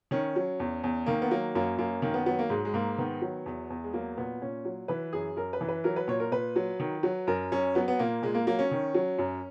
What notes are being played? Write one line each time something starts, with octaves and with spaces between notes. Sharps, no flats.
D#3 C#4
F#3
E2
E2
D#3 A#3
B3
F#3 A#3
F#2 A#3
F#2 A#3
D#3 A#3
B3
F#3 B3
A#3
G#2 G#3
G#3
G#2 A#3
D#3 B3
F#3
E2
E2
G#3
F#3 A#3
A#2 B3
A#2 C#4
F#3
E3 B4
F#2 G#4
F#2 A#4
B4
E3
B4
F#3 A#4
B4
A#2 C#5
A#4
A#2 B4
F#3
D#3
F#3
F#2 A#4
F#2 C#4
F#3 B3
B3
A#2 A#3
A#2 G#3
A#3
F#3 A#3
C#4
D#3
F#3
F#2